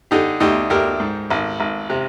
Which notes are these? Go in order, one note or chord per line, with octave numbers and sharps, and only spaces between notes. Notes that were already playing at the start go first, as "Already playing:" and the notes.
D3 D#4 G4
D2 D#4 G4
D2 G4 A#4
G#2
G#1
G#1
C3